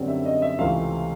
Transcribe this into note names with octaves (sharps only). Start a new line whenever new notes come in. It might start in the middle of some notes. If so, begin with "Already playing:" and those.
Already playing: F#2 D3 G3 C4
E5
D#5
E5
C#2 C3 E3 A3 C4 F5